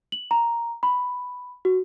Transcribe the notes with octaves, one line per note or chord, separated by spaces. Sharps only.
F#7
A#5
B5
F#4